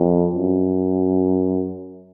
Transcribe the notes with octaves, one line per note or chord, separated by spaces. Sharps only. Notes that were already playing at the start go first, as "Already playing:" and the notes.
Already playing: F2
F#2